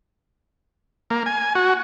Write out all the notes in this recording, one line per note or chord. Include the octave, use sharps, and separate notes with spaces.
A#3
G#5
F#4